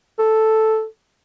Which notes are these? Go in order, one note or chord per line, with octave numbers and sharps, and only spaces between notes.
A4